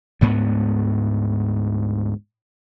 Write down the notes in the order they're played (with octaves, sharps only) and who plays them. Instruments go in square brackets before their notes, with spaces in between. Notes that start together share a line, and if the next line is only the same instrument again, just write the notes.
[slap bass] D2 G#2 B3